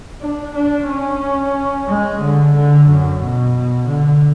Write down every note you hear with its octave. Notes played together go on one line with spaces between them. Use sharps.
D4
D4
C#4
G#3
D3
D3
F#2
B2
D3